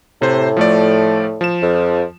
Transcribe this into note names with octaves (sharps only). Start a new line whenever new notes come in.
A2 C3 C5
F3 A3 D5
F3 E7
F2